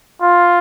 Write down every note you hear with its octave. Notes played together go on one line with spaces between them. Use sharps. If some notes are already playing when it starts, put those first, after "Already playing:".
F4